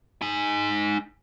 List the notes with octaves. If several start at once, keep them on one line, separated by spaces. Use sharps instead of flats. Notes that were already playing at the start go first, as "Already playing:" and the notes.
D#4 G#5